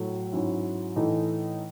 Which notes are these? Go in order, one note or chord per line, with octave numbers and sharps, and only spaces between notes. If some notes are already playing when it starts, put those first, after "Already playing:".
Already playing: A2 F#3 A3
G#2 F#3 C#4 E4
A2 E3 A3 D#4